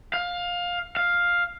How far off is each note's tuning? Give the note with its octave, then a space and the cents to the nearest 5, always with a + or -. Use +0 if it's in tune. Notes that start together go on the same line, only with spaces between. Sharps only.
F5 +15
F5 +5